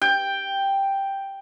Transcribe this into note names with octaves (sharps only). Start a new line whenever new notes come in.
G5